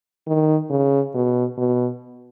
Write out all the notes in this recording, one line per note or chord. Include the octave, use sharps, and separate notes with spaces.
D#3
C#3
B2
B2